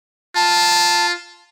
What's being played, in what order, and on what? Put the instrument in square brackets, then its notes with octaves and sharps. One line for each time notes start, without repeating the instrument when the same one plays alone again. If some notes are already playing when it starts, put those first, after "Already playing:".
[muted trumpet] F4 [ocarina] A5